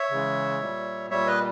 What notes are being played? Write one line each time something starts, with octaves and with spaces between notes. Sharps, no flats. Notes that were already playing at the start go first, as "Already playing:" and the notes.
Already playing: C#5 E5
C#3 E3 G#3
A#2 G3
A#2 G3 C#5 E5
B4 D#5